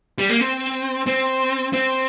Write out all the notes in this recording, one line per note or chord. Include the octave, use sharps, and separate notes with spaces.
G3
A#3
C4
C4
C4